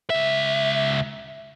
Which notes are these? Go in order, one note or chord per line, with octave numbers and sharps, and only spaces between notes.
C#2 E5